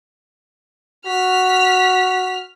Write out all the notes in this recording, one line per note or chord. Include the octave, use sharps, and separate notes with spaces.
F#4 F6 B6